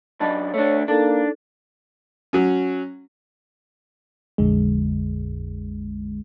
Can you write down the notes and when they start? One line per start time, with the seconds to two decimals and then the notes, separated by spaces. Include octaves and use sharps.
0.21 F#2 D4 D#5 A5 B5
0.54 A3 D4 C#5
0.88 A#3 D4 D#4 A4
2.33 F#3 C#4
4.38 A#1 F2 D3 G#3